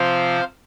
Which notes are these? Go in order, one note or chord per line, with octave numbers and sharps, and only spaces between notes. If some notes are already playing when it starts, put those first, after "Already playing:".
Already playing: C3 F3 C4 C5 F5